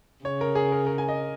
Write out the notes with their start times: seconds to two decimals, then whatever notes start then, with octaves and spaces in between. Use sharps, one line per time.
0.25 C#3 C#5
0.41 A#4
0.55 G#4
0.72 A#4
0.87 A#4
0.98 G#5
1.09 D#5